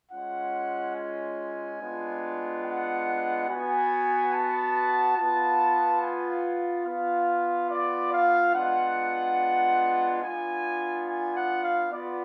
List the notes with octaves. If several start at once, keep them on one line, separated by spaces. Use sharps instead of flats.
G#3 C#4 F4 F#5
G#5
G#3 B3 D4 F4
F#5
B3 F#4 G#5
A5
B3 F4 A5
G#5
B3 F4 F5
D5
F5
G#3 B3 D4 F4 F#5
B3 D4 F4 G#5
G#5
F#5
F5
B3 F4 D5